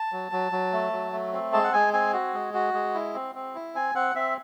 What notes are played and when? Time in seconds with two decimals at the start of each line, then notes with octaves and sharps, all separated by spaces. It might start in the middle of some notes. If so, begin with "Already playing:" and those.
Already playing: A5
0.12 F#3
0.32 F#3
0.52 F#3
0.73 A3
0.92 F#3
1.12 A3
1.33 C4
1.53 G#3 A5
1.64 F#5
1.73 G#3 G#5
1.93 C4 G#5
2.13 F#4
2.34 G#3
2.54 F#4
2.74 G#3
2.95 E4
3.15 C4
3.35 C4
3.55 E4
3.75 C4 G#5
3.95 C4 F#5
4.15 C4 E5